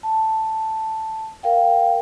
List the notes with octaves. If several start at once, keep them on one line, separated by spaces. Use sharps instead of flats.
A5
A#4 F5 G5